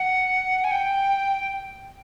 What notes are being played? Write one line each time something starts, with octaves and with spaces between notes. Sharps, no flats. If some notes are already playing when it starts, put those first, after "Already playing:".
Already playing: F#5
G#5
G5